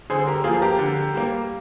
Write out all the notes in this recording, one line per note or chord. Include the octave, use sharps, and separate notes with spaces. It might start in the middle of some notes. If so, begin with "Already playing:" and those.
D3 G#4 C5
G4 A#4
F3 A#3 F4 G#4
G4 A#4
D3
G3 A#3